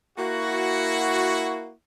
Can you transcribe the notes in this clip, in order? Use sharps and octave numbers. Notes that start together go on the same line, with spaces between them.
A#3 E4 F#4